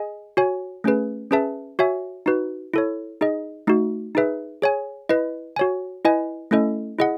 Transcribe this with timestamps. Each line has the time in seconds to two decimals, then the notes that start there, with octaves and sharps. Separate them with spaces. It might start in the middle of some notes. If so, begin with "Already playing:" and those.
Already playing: G#4 D#5 G#5
0.37 F#4 C#5 G#5
0.84 A3 C#4 G#4 B4
1.31 C#4 G#4 B4 E5 A5
1.79 F#4 C#5 E5 G#5
2.26 D#4 F#4 B4
2.74 E4 A4 C#5
3.21 D#4 G#4 D#5
3.67 A3 D#4 F#4
4.15 D#4 G#4 B4 E5
4.62 G#4 C#5 G#5
5.09 E4 B4 D#5
5.56 F#4 C#5 G#5
6.05 E4 B4 D#5 G#5
6.51 A3 C#4 E4 A4 D#5
6.99 E4 G#4 D#5 F#5